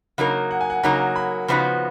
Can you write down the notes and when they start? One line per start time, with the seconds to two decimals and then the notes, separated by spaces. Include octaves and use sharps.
0.18 C#3 F#3 A#3 D#4 A#4 F5
0.51 F#5
0.61 G#5
0.70 F#5
0.83 C#3 F#3 A#3 D#4 A#4 A#5
1.16 B5
1.48 C#3 F3 B3 D#4 F#4